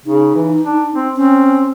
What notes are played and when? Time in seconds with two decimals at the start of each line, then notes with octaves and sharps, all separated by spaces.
0.06 C#3 D#4
0.35 E3
0.63 D4
0.94 C4
1.16 C4 C#4